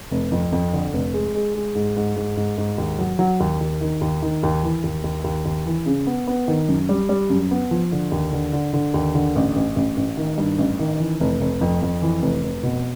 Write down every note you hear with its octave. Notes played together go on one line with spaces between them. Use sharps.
F1
F2
F2
D3
F1
G#3
G#3
G#3
G#2
G#2
G#2
G#2
G#2
D#2
F#3
F#3
D#2
D#2
D#3
D#2
D#3
D#2
E3
D#2
D#2
D#2
D#2
E3
C#3
B3
B3
D#3
F#2
G3
G3
F#2
B3
F3
D3
D#2
D3
D3
D3
D#2
D3
A1
A1
A1
A1
D#3
G2
A1
D#3
E3
F1
F1
F2
F2
E3
F1
F1
B2